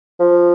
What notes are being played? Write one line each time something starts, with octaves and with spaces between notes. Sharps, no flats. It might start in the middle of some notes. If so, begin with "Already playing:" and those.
F3